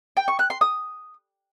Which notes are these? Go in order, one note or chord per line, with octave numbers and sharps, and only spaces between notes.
G5
C#6
F#6
C6
D#6